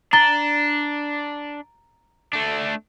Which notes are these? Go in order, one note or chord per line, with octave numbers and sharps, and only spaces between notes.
D4 A#5 A6 G7
A3 D4